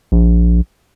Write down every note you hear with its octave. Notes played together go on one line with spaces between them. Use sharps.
A#1